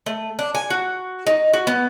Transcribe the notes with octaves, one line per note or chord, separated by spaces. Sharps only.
A3
D4
G#5
F#4
D#4
F#4
B3